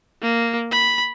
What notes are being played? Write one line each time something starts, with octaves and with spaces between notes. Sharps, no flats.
A#3
B5